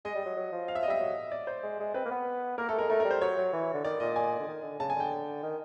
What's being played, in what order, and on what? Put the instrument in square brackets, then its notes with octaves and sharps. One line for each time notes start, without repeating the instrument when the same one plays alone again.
[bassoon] G#3 [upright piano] D#5
[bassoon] G3
F#3
F#3
F3
[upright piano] F5
E5
D#5
[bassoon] G3 [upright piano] E5
[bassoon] F#3
[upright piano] D5
C5
[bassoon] G#3
G#3
[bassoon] C4 [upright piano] B4
[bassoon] A#3
B3
[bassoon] A#3 [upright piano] A#4
[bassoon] A3 [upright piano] A4
[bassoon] G#3 [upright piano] A#4
[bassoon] A3 [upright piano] A#4
[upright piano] A#4
[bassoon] G3
[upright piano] C5
[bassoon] F#3 [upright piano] C#5
[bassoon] F#3
E3
D3
[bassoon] D#3 [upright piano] D5
[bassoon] A#2 [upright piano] D#5
[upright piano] G#5
[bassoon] D3
D#3
D3
[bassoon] C#3 [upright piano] A5
[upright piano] G#5
[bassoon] D3 [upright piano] G5
[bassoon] D#3